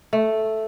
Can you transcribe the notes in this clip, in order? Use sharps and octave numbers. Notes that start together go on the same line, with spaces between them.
A3